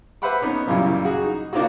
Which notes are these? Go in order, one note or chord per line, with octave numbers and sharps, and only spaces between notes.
B4 C5 E5 F#5 B5 D6
B3 C#4 D#4
F#2 A#2 C#3 E3 G3 A#3
F#4 G#4
D#4
C#3 A#3 D4 D#4 F4 F#4